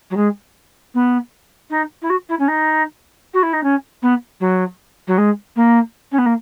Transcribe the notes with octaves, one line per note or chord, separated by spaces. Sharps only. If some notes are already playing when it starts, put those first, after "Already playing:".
F#3
G#3
B3
D#4
E4
F#4
E4
C#4
D#4
F#4
E4
D#4
C#4
B3
F#3
F#3
G#3
A#3
C#4
B3
A#3